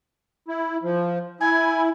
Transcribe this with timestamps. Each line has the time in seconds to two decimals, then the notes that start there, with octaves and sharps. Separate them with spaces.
0.48 E4
0.83 F3
1.40 E4 G#5